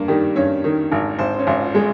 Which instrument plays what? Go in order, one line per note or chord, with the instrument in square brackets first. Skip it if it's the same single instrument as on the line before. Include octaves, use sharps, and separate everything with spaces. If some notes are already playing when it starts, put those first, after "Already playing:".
Already playing: [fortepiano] G2 [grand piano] A#3 A#4
[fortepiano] D#3 [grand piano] G3 G4
[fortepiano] G2 [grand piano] C#4 C#5
[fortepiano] D#3
G#1
[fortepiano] G#1 [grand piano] C4 C5
[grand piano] C5
C#4 C#5
[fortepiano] G#1
[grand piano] F4 F5
[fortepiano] G#3